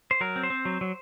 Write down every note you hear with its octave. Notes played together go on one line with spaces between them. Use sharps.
C5
F#3 A#4
C4
C5
C4
F#3
F#3